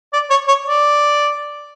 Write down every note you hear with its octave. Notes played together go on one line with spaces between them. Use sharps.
D5
C#5
C#5
D5